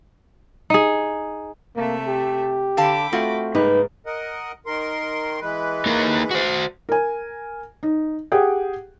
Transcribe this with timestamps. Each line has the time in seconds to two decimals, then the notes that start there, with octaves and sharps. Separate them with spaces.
0.70 D#4 G#4
1.76 C3 A3 A#3 E5
2.07 G4
2.77 D3 F5 G5 A5 B5 D6
3.12 A3 C4 F4 F#4
3.55 G#2 C#3 G3 A#3 D#4 B4
4.06 A#4 D#5 F#5
4.66 D#3 A#4 C6
5.41 E3 G#3 B4
5.86 A#3 D#4 A#4
6.31 F#4 C5
6.89 A#4 G#5
7.83 D#4
8.32 G4 G#4 F#5 G5